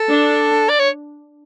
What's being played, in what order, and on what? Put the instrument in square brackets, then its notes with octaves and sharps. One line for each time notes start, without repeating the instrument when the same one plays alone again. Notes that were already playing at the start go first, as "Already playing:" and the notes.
Already playing: [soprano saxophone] A4
[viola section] D4
[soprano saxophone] D5
C#5